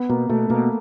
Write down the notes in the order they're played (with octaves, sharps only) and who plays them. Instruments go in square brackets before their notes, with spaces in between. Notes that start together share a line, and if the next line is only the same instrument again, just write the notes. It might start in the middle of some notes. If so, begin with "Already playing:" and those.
Already playing: [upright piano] B3
[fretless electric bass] B2 [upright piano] A#3
[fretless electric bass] B2 [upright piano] A3
[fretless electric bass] B2 [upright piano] A#3